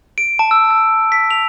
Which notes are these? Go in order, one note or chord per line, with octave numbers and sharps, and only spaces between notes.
D7
A5
E6
E6
B6
F7